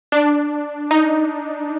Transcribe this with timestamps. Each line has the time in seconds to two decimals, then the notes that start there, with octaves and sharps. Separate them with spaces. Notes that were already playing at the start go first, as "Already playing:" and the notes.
0.12 D4
0.91 D#4